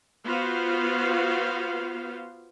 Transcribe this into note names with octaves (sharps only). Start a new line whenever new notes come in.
B3 F4 F#4 C5 F5